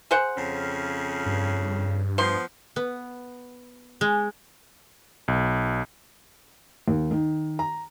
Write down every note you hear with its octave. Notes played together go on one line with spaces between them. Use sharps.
G#4 C5 F#5
F2 C#3 C#4
G2
F3 B3 C5 C6
B3
G#3
B1
D#2
D#3
A#5